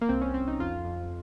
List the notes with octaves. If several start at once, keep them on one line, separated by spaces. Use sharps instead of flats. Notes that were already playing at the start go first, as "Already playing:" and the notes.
A#3
C2 C4
C#4
C2 C4
D#4
F2 F4
F2